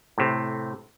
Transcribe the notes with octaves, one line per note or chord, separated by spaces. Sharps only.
A2 C3